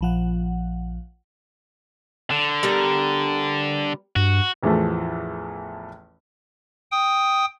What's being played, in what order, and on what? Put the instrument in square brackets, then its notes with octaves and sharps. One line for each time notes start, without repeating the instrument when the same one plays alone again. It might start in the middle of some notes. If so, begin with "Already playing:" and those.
[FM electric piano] A#1 F3 F#5
[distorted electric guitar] D3
[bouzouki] G3 B3 A#4
[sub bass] G2 [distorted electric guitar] F#4
[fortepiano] A1 E2 E3 F3 A3
[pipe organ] G5 D#6